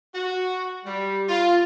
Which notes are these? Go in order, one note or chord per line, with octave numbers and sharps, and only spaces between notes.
F#4
G3
F4